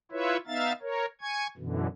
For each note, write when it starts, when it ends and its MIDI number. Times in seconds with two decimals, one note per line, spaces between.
0.12 0.37 64
0.12 0.37 65
0.12 0.37 71
0.12 0.37 73
0.12 0.37 76
0.47 0.72 59
0.47 0.72 63
0.47 0.72 76
0.47 0.72 77
0.47 0.72 93
0.82 1.05 70
0.82 1.05 73
1.21 1.47 80
1.21 1.47 85
1.21 1.47 92
1.57 1.87 42
1.57 1.87 47
1.57 1.87 50
1.57 1.87 52